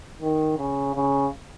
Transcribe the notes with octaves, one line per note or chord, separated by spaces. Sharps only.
D#3
C#3
C#3